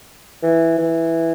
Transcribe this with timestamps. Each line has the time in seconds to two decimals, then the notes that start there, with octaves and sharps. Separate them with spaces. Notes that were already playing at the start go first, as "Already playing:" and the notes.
0.43 E3
0.78 E3